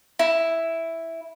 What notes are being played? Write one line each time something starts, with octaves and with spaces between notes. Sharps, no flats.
E4